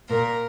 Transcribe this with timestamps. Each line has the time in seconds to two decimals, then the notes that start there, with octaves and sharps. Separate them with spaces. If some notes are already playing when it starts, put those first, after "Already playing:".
0.09 A#2 A#4